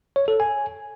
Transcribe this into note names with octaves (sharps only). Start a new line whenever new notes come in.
C#5
A4
G#5